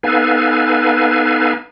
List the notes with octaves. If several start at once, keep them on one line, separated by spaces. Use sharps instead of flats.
B3 D#4 A4 B4 F5 G#5